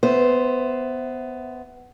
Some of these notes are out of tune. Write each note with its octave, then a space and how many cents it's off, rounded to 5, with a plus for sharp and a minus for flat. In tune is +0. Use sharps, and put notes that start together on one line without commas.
B3 +15 C5 +0 E5 +0